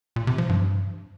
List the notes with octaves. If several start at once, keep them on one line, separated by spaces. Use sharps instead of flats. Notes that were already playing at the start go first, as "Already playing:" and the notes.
A#2
C3
F3
G2